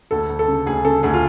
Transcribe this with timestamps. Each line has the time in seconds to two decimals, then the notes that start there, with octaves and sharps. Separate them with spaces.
0.11 D2 A4
0.29 D2
0.39 A4
0.48 C#3
0.66 D2 G#4
0.85 C#3 A4
1.03 D2 G#4
1.14 F4